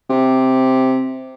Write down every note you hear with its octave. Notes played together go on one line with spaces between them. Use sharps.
C3